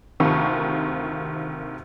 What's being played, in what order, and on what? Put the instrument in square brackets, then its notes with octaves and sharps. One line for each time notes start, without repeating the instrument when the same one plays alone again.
[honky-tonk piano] D2 C3 D#3 F4 A5 C#6